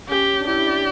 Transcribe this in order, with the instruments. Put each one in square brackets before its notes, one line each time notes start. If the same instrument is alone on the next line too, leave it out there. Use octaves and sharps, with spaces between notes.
[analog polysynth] C#4 [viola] G4
[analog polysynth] D4
[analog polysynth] E4 [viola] G4
[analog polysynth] D5